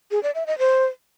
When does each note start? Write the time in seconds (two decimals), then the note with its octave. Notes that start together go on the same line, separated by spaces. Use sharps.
0.11 G#4
0.23 D5
0.35 E5
0.47 D#5
0.59 C5